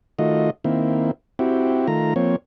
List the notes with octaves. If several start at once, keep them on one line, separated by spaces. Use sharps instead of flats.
D#3 A3 F4 F#4 D#5
D#3 A#3 C4 E4
C4 E4 F#4 G4
D#3 A3 F4 A#5
F3 A#3 C4 C#5